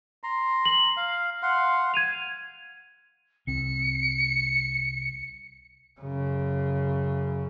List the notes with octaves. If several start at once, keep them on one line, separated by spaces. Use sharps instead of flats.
A#5 C6
F#7
F5
F5 F#5 C6
G#6 D#7 F7
C2 C4 C#7
F#2 C#3